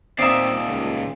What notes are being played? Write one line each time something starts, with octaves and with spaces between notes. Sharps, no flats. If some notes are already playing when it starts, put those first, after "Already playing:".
D#2 A#2 C4 D5 E5 A#5 D#6 C7
C#2